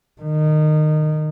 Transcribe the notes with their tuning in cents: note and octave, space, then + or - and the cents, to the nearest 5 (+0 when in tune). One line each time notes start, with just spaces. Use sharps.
D#3 -20